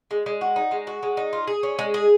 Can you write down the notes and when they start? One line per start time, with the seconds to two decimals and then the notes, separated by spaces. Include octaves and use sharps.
0.11 G#3
0.26 G#3
0.41 F#4
0.56 D#4
0.71 G#3
0.87 F#4
1.03 G#3
1.17 D#4
1.33 F4
1.47 G#4
1.63 C#4
1.79 G#3
1.94 G#4